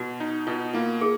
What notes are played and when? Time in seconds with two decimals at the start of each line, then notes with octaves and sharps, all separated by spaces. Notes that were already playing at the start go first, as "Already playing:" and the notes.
Already playing: B2 F#4
0.20 D#4
0.47 B2 F4
0.74 A#3 F4
1.01 G#4